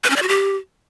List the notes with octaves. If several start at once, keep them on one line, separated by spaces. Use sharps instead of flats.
B4
C#4
D5
F#4
G4